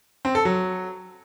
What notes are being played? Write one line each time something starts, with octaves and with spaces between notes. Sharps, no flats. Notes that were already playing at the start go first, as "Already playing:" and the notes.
C4
A4
F#3